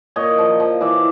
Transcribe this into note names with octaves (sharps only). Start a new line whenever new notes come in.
A#2 C#5 D#5
F3
F3
E3 D5 E5